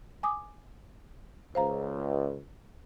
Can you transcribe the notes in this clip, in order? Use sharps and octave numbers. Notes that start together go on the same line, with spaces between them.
G#5 D6 D#6
C#2 C5 F5 A#5